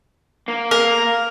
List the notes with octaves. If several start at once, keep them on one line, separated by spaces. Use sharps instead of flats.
A#3
A#4